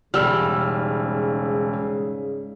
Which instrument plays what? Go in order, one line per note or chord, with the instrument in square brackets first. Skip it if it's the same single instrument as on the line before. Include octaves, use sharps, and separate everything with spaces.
[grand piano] E1 E6 F6 [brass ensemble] G#2 C#3 [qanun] G3